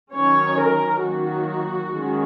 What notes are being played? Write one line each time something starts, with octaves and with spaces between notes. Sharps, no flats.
D#3 F#3 C#4 C#5
A#4
D#3 F#3 A#3 F#4
D#3 G#3 C#4